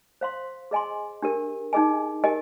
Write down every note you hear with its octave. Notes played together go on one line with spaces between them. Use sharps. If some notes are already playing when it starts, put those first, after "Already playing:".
C5 F5 C6
G#4 D#5 G#5 C6
D4 G4 A#4
D#4 G#4 D#5 G#5
G4 A#4 D#5 G#5